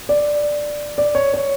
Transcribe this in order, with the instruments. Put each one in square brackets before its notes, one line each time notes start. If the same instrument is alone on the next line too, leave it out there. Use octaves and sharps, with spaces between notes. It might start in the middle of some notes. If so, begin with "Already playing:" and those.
[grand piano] D5
D5
C#5
C#5